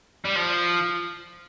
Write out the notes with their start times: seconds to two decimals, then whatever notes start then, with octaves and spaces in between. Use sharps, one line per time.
0.25 G3
0.35 F3